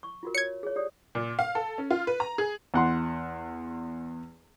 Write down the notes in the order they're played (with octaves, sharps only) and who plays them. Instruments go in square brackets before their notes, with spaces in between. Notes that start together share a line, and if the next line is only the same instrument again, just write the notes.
[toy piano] C#6
F4 F#4 A#4
[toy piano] C#5 [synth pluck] G#6 C#7
[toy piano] G#4 C#5
G4 D5 D#6
[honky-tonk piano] A#2
F5
A4
C#4
F4
B4
A#5
G#4
[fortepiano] E2 F#5 C6